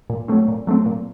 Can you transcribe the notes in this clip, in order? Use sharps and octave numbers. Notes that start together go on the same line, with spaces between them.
A#2
F#3 A3 C4
A#2
F#3 A3 C4
A#2